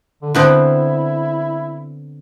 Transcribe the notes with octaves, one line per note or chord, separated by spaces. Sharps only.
D3
D3 B3 C4 E4